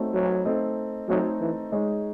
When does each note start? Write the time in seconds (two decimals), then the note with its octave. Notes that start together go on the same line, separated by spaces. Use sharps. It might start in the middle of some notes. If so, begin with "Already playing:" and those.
Already playing: A3 C4 D#4 F#4 C#5
0.14 F#3
0.45 A3 C4 D#4 A4 D#5
1.09 F#3 A3 C4 D#4 A4 D#5
1.40 E3
1.72 G#3 D#4 G#4 C#5